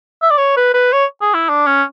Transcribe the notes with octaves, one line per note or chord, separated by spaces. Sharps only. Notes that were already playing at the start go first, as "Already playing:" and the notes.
E5
D5
C#5
B4
B4
C#5
G#4
E4
D4
C#4